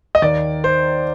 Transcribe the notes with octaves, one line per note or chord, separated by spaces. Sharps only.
D#5
D#2 D#3 D5
C5